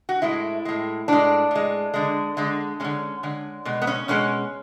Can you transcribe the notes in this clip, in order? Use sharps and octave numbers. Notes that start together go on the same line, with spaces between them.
F#4
A2 G#3 E4
A2 G#3
A2 G#3 D4
A2 G#3
D3 G#3
D3 G#3
D3 G#3 C#4
D3 G#3
B2 G#3
B3
C#4
B2 G#3 C#4